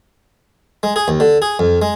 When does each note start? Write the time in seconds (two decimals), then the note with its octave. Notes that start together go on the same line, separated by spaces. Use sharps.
0.83 G#3
0.96 G#4
1.08 D#2
1.20 D3
1.42 G#4
1.59 F2
1.82 G#3